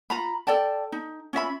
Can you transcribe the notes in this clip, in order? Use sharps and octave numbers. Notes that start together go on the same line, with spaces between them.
F4 A#5 B5
A4 D5 G5 A5
D#4
C#4 F4 E5 B5